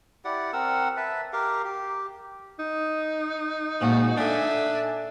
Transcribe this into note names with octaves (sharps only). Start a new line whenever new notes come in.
E4 G4 D5 F#5
C4 A#4 F#5 E6
B4 E5 A5
G4 A#4 F5
G4
D#4
D2 A#2 F3 G#3 F#4
D4 A4 D5 E5 G#5